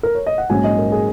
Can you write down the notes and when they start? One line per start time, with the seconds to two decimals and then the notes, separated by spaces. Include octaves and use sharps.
0.03 A#4
0.15 C#5
0.27 D#5
0.38 F#5
0.50 A#1 G#2 F#3 C#4 G#5
0.64 D#5
0.78 A#4
0.92 G#4